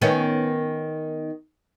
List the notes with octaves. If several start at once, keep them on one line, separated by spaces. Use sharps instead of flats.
D#3 B3 C#4